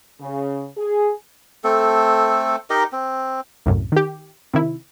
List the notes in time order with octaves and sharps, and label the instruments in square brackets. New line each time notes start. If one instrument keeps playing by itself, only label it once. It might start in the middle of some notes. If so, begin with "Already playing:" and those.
[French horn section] C#3
G#4
[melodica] A3 C4 A4
D#4 G4 A#4 D#5
C4
[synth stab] C2 F#2 A2
D#3 G4
C3 D#3 E4